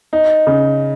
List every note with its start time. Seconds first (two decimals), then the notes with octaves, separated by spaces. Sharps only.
0.13 D#4
0.47 C#3